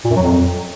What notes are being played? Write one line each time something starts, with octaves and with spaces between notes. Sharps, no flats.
A#2
F#2
F#3
F2